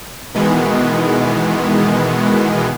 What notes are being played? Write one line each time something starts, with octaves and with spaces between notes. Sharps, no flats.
B2 D#3 E3 G#3 B3